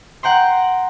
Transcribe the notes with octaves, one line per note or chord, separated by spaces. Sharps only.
F#5 G5 A#5 C6